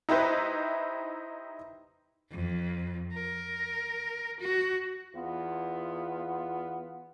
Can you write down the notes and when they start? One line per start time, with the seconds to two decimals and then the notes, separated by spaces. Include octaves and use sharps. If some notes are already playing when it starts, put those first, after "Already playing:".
0.09 D#4 E4 G4 B4 C5
2.31 F2
3.14 A#4
4.40 F#4
5.15 E2 B3 F4